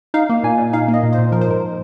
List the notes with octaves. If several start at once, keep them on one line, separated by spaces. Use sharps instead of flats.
D#4 F5
A#3
A#2 G#5
A#2
D#4 F5
A#3
D#5
A#2
C5
A#2
F3 A#4
C5
G#2 A#4